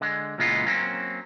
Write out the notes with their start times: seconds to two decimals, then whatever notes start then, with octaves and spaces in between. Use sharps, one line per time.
0.01 D3 G#3
0.38 C#2 A#2 E3 G#3 B3 F4
0.66 F#3 A#3 C4 C#4